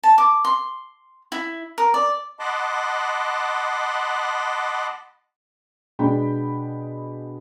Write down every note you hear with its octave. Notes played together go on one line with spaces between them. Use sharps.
A5
D6
C6
E4
A#4
D5
D#5 F#5 A5 B5 C6 D6
B2 G#3 D4 G5 B5